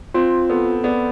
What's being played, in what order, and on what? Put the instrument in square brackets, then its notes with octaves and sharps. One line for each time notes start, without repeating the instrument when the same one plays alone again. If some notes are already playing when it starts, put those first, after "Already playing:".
[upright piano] C4 [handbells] F4
[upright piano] B3 [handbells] A4
[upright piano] B3 [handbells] D5